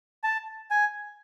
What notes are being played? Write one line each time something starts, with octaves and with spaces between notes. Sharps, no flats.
A5
G#5